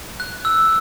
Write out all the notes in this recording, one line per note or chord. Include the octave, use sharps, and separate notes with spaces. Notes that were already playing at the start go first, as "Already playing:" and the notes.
F#6
E6